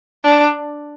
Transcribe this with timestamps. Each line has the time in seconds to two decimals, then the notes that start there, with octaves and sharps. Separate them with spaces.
0.24 D4